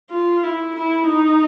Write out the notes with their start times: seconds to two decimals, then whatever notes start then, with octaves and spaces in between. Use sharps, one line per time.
0.11 F4
0.43 E4
0.76 E4
1.07 D#4